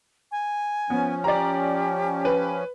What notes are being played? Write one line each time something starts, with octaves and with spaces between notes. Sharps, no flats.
G#5
F3 B3 C#4
G4 D5 A#5
B4